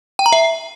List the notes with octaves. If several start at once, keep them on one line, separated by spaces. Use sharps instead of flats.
G5
A#5
E5